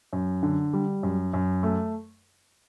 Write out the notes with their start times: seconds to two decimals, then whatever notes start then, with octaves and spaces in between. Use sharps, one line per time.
0.13 F#2
0.43 D3
0.73 G3
1.03 F#2
1.33 F#2
1.63 A3